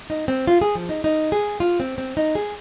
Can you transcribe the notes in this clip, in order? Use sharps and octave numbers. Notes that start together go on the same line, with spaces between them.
D#4
C4
F4
G#4
F3
D#4
D#4
G#4
F4
C4
C4
D#4
G#4